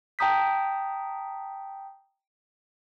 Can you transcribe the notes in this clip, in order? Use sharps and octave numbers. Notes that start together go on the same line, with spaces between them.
G5 A5 A#5 D#6 G6 B6